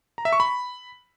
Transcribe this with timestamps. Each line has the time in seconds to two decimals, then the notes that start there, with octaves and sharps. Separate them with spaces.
0.18 A#5
0.25 E5
0.33 C#6
0.40 B5